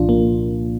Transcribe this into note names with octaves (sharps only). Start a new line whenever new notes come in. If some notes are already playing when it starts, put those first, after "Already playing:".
Already playing: C2 A#2 F3 D4 F4
A#3